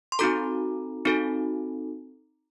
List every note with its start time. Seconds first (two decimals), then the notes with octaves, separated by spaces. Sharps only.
0.12 C6
0.19 C4 D#4 F#4 A4 A#5 D6
1.05 C4 D#4 F#4 A4